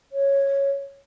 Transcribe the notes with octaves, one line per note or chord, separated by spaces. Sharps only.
C#5